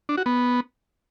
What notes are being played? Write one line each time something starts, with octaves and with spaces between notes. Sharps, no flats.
D4
F#4
B3